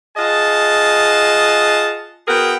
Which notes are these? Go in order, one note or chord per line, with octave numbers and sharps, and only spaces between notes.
F4 G#4 D#5 F#5 A5
B3 F#4 G#4 A#4 G5